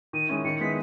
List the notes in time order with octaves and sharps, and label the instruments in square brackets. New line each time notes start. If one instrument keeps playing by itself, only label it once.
[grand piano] D#3 [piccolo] D#7
[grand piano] G#3 C#4 E4
[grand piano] D#3 [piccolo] C#7
[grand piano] G#3 B3 E4 [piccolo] B6